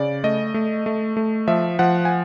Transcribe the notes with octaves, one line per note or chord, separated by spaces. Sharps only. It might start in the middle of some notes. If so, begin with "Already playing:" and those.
Already playing: C#3 D5
A3 D#5
A3
A3
A3
F3 E5
F3 F#5
G#5